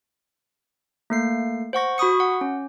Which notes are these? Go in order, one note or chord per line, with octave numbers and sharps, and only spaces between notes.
A3 A#3 C7
C5 F#5 C#6 A#6
F#4 B5 C#6 D#6 C#7
F#5
C#4